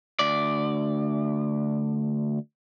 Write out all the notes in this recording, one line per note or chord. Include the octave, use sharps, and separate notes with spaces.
D2 D5